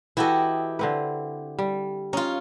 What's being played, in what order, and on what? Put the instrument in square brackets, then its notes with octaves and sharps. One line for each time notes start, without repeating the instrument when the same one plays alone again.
[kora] E3 F#4 A4 [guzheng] E4 G4 D#5
[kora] D3 C4 B4
G3
[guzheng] C#4 F4 [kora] D#4